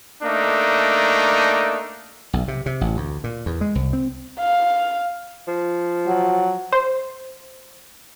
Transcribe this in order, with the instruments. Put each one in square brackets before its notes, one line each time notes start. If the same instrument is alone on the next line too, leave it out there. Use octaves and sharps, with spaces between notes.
[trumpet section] A3 A#3 D4 D#4
[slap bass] B1
C3
C3
A1
D2
A#2
E2
G#3
C2
C4
[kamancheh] F5
[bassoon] F3
[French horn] F#3
[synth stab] C5